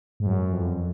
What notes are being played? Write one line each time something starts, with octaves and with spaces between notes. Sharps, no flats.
G#2
F#2
F2